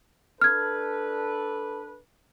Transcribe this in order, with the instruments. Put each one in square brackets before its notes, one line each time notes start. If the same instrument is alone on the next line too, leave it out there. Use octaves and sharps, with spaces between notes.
[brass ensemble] D4 A4 B4 [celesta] F6 G#6